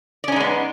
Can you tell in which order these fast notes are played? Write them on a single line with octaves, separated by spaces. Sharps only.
D5 C#4 D#4 G#3 B3